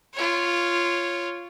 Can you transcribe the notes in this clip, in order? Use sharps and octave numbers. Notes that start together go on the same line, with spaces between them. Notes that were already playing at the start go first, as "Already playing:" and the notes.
F4 C#5